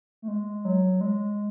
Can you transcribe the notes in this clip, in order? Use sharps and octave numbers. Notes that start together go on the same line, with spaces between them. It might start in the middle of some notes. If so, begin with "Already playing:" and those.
A3
G#3
F#3
G#3